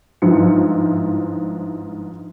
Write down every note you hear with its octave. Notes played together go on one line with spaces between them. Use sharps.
G1 G#2 F3 E4 C#7